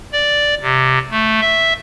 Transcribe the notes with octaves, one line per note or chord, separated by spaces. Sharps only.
D5
C3
A3
E5